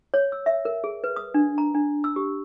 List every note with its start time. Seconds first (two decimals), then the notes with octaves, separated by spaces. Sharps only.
0.14 C#5
0.32 E6
0.46 E5
0.65 A#4
0.84 G#4
1.04 B4
1.16 D#6
1.34 D4
1.58 A#5
1.74 D4
2.04 E6
2.16 G4